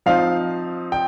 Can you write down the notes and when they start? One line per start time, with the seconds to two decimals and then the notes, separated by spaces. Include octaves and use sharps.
0.06 F3 C4 D#4 F5
0.92 G5